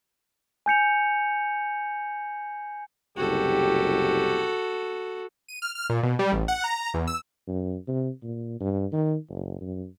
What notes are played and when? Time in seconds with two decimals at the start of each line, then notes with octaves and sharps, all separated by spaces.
0.66 G#5 G6 C#7 F7
3.17 F#1 C2 F#4 G4 A4
5.48 D#7
5.62 F6
5.75 F6
5.90 A#2
6.03 B2
6.19 G3
6.32 A1
6.48 F#5
6.64 A#5
6.94 E2
7.07 E6
7.47 F#2
7.88 C3
8.23 A#2
8.60 G2
8.92 D#3
9.30 F#1
9.61 F#2